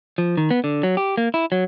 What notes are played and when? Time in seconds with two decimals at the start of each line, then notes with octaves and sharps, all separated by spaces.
0.18 F3
0.37 D#3
0.51 B3
0.64 D3
0.83 F#3
0.97 G4
1.17 A#3
1.34 E4
1.52 F#3